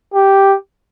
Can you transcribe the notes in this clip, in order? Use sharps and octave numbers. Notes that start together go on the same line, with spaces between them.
G4